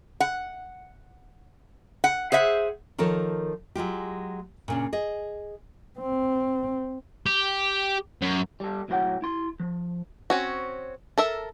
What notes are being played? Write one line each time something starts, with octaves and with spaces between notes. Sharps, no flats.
F#5
F#5
G#4 C5 E5 F#5
D#3 F3 A4 A#4 C#5
F#3 G#3 F4 G4
A#2 C#3 D4
G#4 D#5
C4
G4
F#2
G3 A4
B1 A2 F#3 A#4 F#5 G5
E4 C6
F3
C4 C#4 F#4
A4 A#4 E5